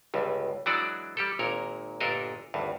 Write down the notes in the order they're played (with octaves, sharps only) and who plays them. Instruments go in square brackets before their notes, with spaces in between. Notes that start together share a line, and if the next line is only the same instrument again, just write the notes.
[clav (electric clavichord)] G1 C#2 G2
E3 F#3 G#3 D4 F#4 D5
G3 G4 A4
G#1 A#2 A#4 C#5
G1 A#2 D4 A4 A#4 D#5
G#1 D2 G2